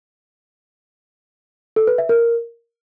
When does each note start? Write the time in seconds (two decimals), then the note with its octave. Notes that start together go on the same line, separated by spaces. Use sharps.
1.76 A4
1.87 B4
1.98 E5
2.09 A#4